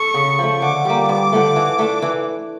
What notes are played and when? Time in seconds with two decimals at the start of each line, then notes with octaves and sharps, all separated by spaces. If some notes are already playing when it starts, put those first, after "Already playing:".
Already playing: A4 C#6
0.14 C#3
0.39 F3 A3
0.62 D3 D6
0.85 G3 A#3
1.09 G2 D6
1.32 D3 F3 A3
1.56 E3
1.79 A3 D4
2.02 E3